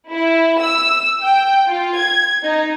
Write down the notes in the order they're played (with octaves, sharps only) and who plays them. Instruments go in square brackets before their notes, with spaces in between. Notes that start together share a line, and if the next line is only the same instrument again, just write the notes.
[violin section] E4
E6
G5
F4
G#6
D#4